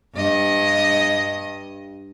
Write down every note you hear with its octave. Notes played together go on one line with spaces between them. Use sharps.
G2 D#5